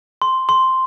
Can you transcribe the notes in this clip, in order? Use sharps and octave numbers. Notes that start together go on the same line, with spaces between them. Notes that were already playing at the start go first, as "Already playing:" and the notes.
C6
C6